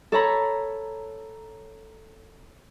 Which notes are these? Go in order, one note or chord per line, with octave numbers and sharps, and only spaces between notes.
A4 C#5 A#5 B5